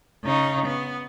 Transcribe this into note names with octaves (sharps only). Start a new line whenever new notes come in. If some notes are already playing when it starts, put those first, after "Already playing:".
C#3 D#4
B3